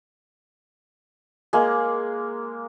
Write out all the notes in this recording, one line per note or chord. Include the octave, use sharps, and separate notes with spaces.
G#3 A#3